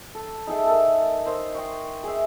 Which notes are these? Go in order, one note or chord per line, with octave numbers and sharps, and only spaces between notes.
A4
D#4 G#4 A4 E5
A4 A#4
D#4 A#4 C5 E6
D#5 G5 C6 C#6
G#4 E5